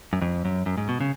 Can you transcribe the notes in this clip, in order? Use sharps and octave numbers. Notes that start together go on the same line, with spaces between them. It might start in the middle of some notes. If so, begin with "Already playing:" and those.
F#2
F2
F#2
F#2
G#2
B2
C#3